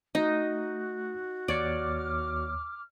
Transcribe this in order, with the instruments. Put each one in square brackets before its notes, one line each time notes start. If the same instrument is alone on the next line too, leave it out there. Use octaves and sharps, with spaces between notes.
[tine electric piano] A3 [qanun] D#4 [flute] F#4
[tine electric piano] D#2 C#5 C#7 [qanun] D5 [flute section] D6 F6